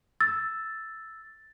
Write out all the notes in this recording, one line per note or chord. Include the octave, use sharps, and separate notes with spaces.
E6 A6